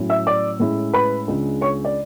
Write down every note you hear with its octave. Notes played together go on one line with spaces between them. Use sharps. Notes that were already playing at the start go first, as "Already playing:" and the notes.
Already playing: A2 F#3 C#4 E4
E5 E6
D5 D6
A2 G#3 C#4 E4
B4 B5
C#2 C#3 G#3 D4
C#5 C#6
D5